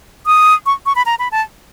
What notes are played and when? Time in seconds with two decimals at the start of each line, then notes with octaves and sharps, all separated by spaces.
0.26 D#6
0.66 C#6
0.86 C#6
0.96 B5
1.06 A#5
1.19 B5
1.32 A5